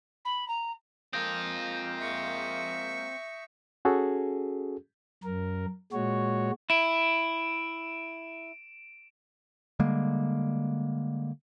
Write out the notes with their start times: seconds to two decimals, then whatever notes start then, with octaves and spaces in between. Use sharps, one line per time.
0.25 B5
0.48 A#5
1.13 G#3 A#3 C4 F4 D#6 G6 A#6
1.98 E5 C#6
3.85 C#4 F#4 G#4 A4
5.24 F#2 A#4
5.93 A#2 G#3 F#4 C#5
6.70 E4 D7 E7
9.79 D3 G3 G#3 A#3